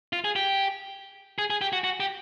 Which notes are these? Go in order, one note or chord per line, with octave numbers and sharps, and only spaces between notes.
F4
G#4
G4
G#4
G#4
G4
F#4
F#4
G4